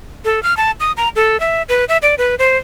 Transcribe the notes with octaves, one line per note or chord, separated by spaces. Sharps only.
A4
F6
A5
D#6
A#5
A4
E5
B4
E5
D5
B4
C5